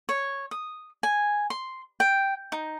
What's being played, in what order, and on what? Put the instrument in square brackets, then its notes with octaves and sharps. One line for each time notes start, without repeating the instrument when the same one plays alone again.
[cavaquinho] C#5
D#6
G#5
C6
G5
D#4